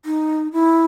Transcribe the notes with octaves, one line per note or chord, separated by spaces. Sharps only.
D#4
E4